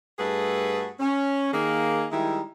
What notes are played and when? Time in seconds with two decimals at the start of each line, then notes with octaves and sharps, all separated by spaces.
0.19 G2 A3 F#4 G#4 A4 B4
1.00 C#4
1.53 D#3 A#3 G#4
2.12 D#3 G3 G#3 D#4 E4